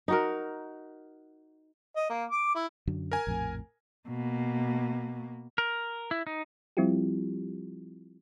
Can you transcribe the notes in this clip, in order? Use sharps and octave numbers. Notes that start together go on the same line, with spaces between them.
D#4 F#4 A#4
D#5
A#3
D6
E4
F#2 D3 F#3
A#4 G#5
A#1 F2 A2
B2 A#3
A#4
E4
D#4
F3 G3 C4 E4 F4 G4